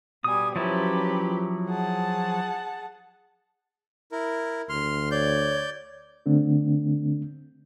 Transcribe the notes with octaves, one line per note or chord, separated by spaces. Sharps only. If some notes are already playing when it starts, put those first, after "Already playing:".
B2 G3 G#5 D#6
F3 F#3 C#4 E4 G4 B4
G#4 F#5 A5
E4 A#4
D2 C6 F6
C#5 D5 G6
D3 A3 C4 D4